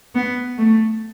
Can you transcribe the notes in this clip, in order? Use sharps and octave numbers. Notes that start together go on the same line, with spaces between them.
B3
A3